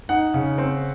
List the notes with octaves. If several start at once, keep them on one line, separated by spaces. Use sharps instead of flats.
D#4 F#5
C#3
C4